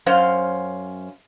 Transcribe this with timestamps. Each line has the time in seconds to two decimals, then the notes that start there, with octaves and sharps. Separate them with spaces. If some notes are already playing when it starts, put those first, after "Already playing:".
0.06 F#2 C#4 C5 F5